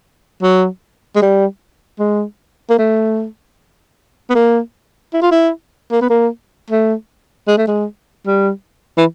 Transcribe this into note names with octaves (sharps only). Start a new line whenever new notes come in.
F#3
G#3
G3
G#3
A#3
A3
B3
A#3
E4
F4
E4
A#3
B3
A#3
A3
G#3
A3
G#3
G3
E3